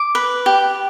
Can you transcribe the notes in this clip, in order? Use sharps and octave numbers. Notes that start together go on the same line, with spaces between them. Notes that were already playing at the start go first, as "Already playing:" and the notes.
Already playing: D6
B4
G4